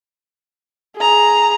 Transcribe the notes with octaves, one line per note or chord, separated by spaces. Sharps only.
G#4 A#5